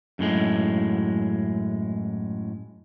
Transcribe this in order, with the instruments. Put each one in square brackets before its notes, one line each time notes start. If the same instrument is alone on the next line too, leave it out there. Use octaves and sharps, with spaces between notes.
[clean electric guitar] F#2 A2 G#3